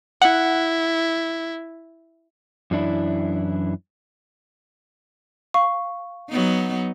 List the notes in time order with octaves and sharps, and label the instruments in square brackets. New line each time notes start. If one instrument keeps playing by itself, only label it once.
[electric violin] E4 [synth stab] F#5
[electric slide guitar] F#2 E3 D4 E4
[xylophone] F5 C#6
[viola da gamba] F#3 B3 D#4